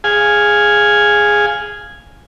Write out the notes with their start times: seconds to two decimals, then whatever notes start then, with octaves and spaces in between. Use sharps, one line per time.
0.04 G#4 F5 G#5